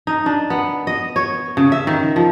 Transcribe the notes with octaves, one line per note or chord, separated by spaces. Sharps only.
D#4
D4
B3
D#5
C#5
C#3
E5
D#3
F3